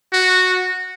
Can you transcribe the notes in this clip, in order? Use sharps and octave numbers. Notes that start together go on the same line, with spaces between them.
F#4